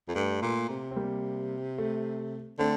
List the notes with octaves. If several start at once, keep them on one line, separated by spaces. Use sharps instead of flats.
F2
G2 A3
A#2
C3
C4
G3 A#3
A3
D3 A3 C4